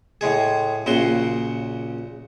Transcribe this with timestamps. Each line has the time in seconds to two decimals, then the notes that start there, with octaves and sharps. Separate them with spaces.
0.21 A2 G#3 G#4
0.86 A#1 C#3 F#4 C6